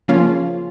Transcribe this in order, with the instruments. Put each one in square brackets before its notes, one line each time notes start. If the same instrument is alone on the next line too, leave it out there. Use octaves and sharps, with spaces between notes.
[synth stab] C#3 F3 A#3 C#4 F4